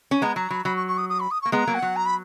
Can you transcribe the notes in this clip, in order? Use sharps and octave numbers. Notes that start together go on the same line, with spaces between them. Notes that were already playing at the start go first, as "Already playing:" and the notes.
C#4
G#3 B3 A#5
F#3 A#5
F#3 B5
F#3 B5
C#6
C#6
D#6
D#6
B5
D#6
A#3 C#6
G#3 B3 A#5
F#3 A#3
F#5
F#3
A#5
B5